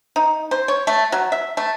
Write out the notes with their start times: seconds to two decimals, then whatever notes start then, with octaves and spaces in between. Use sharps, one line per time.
0.16 D#4
0.51 C5
0.68 C#5
0.87 A3
1.12 F#3
1.32 E5
1.57 A3